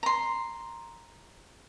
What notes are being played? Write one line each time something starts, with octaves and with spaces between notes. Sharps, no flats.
A#5 C6